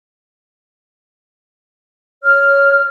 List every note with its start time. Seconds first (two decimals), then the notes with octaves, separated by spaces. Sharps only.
2.23 C#5 F6